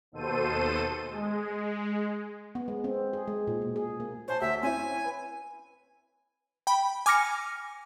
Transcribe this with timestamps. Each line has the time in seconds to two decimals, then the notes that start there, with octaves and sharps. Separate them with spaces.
0.12 D#2 B2 A4 C5 D#7
1.05 G#3
2.55 B3
2.68 G#3
2.84 C4
3.13 G#4
3.28 G#3
3.47 A#2
3.62 B2
3.76 G#4
4.00 A#3
4.28 C5 C#5 G#5 A5
4.41 D2 E5
4.63 C4 C#4 E4 G#5
5.04 B4
6.67 G5 B5
7.06 G#5 D6 F6 A#6 C#7